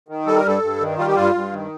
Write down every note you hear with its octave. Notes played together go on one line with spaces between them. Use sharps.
D#3
G3 A4
A#4
G2 A4
G2
D#3
G3 F4
G4
G2 F4
G2
D#3